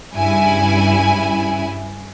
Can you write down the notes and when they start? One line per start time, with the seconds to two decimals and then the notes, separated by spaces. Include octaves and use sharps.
0.13 G2 C#3 E4 G#5